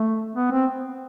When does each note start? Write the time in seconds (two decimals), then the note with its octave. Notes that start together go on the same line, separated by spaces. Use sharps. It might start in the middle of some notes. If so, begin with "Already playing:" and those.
Already playing: A3
0.35 B3
0.51 C4